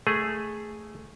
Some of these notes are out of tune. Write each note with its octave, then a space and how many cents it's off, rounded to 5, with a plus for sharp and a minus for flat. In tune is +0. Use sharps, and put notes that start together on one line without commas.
A3 +0 G#4 +0